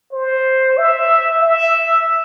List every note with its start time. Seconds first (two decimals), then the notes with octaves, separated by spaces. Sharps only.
0.13 C5
0.78 E5
1.41 E5